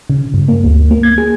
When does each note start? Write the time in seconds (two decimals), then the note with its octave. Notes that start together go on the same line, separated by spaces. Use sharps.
0.10 C#3
0.34 G2
0.48 A#3
0.64 D2
0.91 A#3
1.03 G#6
1.18 G#4